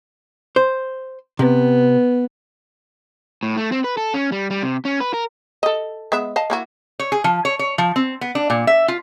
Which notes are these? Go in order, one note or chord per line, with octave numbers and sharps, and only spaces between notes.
C5
C3 B3
A2
A3
C4
B4
A4
C#4
G3
G3
C3
C#4
B4
A#4
A4 D#5
G#3 B3 E5
D#5 F5 A5
A#3 E4 F#4
C#5
G#4
F3
C#5
C#5
F3
C4
B3
D4
A#2
E5
F4